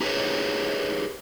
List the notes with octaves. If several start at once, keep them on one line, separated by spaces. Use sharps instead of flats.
D#4 G4 G#4 A#4 B4 C#5